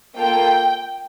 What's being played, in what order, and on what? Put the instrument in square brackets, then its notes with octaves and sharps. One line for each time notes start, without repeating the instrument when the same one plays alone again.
[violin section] A#3 F4 A4 G5